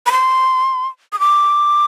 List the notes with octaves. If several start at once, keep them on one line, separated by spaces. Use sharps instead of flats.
B5
C6
D#6
D6